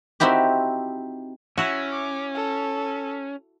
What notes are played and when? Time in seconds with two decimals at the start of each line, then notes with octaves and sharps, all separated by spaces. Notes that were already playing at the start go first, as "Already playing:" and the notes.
0.20 C4 D#4 E4 F#4 G4
1.58 C#4 E4 F#4
1.92 D6
2.34 A4